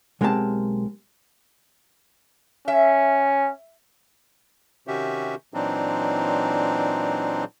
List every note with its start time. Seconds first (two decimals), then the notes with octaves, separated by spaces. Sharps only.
0.21 B1 G#3 A#3 C4 G4 A5
2.68 C#4 E5
4.87 C3 D#3 C#4 F#4 G4 E5
5.54 A#2 E3 F#3 C4 D4 D#4